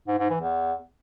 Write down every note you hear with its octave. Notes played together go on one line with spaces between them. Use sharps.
G#2
G#2
E3
E2